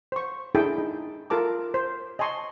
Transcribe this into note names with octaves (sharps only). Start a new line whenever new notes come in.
C5 C#6
D4 E4 G#4 A4 G5 A5
D#4
F4 A4 A#4 A5 D6
C5
D#5 G#5 A5 C6 C#6